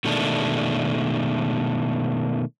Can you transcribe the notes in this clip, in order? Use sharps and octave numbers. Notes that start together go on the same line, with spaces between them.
B2 D#3 G#3 A3 D4